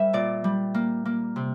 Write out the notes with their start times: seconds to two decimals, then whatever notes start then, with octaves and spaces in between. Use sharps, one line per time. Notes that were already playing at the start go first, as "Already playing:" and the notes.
Already playing: G3 A#4 C5 E5
0.13 A#2 D5
0.44 G3
0.74 A#3
1.05 A#3
1.36 C3